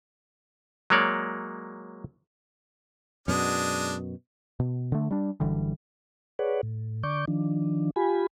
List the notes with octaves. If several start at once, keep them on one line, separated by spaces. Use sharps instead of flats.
F#3 G#3 A#3 C#5 D5
F#2 B2 G#3 D4 D#6
B2
D3 A3
G3 D4
F#1 D3 E3 G3
G#4 B4 C#5 D5 F#5
A2
D3 D5 C#6 D6 G6
D#3 F3 D4
F4 G4 G#5 B5